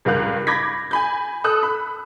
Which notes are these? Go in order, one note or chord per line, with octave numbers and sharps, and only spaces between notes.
C#2 G2 A#4 F5 F#6
B5 D6 G6 G#6 A#6 B6
G#5 B5 G6
A4 D#6 E6 F#6
B5